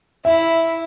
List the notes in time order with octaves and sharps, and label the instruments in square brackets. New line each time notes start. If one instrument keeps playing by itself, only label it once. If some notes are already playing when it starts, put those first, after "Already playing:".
[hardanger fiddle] E4 [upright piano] E5